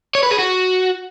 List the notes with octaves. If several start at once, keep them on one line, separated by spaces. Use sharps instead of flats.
C#5
B4
G#4
F#4